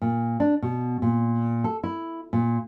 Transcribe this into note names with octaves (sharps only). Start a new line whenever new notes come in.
A#2
D4
B2
A#2
A4
E4
A#2